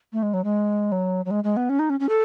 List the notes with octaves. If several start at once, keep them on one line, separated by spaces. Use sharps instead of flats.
A3
G#3
F#3
G#3
F#3
F#3
G#3
G#3
B3
C#4
D#4
C#4
C#4
A4